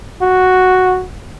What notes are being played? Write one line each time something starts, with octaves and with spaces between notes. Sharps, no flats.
F#4